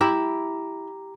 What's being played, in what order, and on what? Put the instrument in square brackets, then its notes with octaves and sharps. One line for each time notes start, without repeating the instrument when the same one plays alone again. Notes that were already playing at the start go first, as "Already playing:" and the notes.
[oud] E4 [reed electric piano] G4 A#5 D6